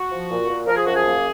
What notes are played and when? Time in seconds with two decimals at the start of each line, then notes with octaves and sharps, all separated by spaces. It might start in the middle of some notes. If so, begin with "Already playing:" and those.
Already playing: F#4
0.11 F3
0.30 A#2
0.49 A#2
0.67 F3 A#4
0.76 G#4
0.86 F#2 F#4
0.95 G#4
1.05 A#3